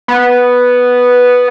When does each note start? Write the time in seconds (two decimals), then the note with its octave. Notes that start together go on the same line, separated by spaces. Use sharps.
0.08 B3